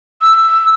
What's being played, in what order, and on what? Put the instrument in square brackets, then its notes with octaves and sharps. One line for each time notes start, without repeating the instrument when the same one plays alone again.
[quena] E6